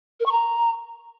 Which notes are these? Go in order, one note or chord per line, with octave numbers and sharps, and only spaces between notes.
A#4
C#6
A#5